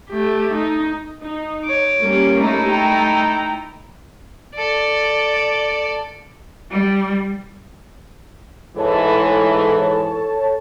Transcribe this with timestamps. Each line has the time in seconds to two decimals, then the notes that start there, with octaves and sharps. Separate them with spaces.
0.10 A3 G4
0.54 D#4
1.22 D#4
1.64 C#5 D6
2.01 G3 A#3 C#4
2.37 A3 D#4 E4
2.69 G5 A#5
4.54 A4 D5
6.71 G3
8.77 G#2 E3 A4 C#5 A5